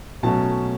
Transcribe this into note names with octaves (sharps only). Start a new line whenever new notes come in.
B2 F#3 A3 C#4 A5